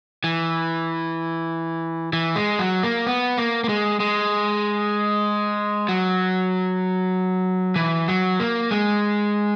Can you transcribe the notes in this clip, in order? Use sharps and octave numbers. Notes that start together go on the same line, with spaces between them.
E3
E3
G#3
F#3
A#3
B3
A#3
A#3
G#3
G#3
F#3
E3
F#3
A#3
G#3